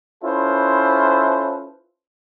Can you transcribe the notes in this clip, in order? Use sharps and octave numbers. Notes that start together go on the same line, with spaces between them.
C#4 E4 F4 A4 B4 C5